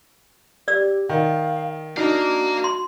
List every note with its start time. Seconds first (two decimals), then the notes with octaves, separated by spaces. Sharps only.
0.68 G4 D5 E6
1.09 D#3 F5
1.97 D4 D#4 F#4 F5 A#5
2.64 C6